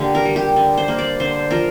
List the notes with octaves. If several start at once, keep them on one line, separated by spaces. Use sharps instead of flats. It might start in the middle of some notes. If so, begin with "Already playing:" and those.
Already playing: D3 A#3 G4
A#4
G3
G4
D3
C5
A#3
D5
D3 C5
F3 A#4